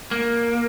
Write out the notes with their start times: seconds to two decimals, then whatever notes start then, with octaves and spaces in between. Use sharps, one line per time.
0.11 A#3